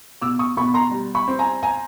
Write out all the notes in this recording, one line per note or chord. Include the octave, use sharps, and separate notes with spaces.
B2 D6 E6
C#6 D#6
B2 B5 C#6
A#5 C6
G3
B5 C#6
C4
G#5 A#5
G#5 A#5